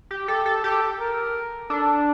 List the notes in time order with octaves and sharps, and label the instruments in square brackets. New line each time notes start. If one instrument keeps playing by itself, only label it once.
[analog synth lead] G4
[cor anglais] G4 [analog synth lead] A4
[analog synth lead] A4
[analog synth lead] G4 [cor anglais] A4
[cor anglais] A#4
[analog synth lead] D4 [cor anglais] A4